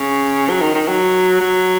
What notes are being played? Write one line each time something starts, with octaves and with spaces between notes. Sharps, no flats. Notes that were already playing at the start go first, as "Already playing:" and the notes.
Already playing: C#3
F#3
D#3
D#3
F#3
F#3